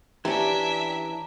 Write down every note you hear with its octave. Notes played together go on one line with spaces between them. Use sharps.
E3 C#4 D4 G4 E5 A#5